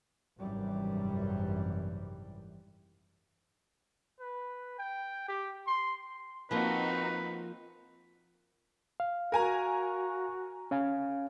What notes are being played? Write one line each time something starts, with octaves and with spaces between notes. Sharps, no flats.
G#1 F#2 C3 E3 G3
B4
G5
G4
C6
F3 A#3 C4 D#4 F#4 B4
F5
F#4 A#4 G#5 A#5
C#4 F5 G#5